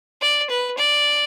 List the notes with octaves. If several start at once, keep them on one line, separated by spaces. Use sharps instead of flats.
D5
B4
D5